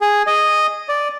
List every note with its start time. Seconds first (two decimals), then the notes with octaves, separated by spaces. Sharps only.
0.01 G#4
0.27 D#5
0.89 D5